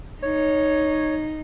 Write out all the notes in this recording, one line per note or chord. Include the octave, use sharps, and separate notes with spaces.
D#4 C#5